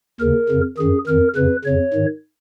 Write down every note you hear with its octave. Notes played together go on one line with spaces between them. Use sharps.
D#2 C#3 A#4
F2 C#3
F#2 D#3 G#4
F2 D#3 A#4
F2 C#3 B4
F2 C#3 C#5
G#2 D#3